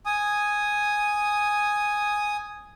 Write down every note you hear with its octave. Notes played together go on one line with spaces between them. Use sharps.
G#5 D#6